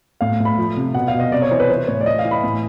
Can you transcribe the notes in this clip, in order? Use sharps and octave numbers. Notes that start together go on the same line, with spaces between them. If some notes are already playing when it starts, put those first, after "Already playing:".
A2 F5
A2
B5
F3
C3
B2 F#5
F5
B2
D#5
C3 D5
C#5
E3 C5
B4
E3 C5
A2 C#5
D5
E3 D#5
F5
E3
B5
A2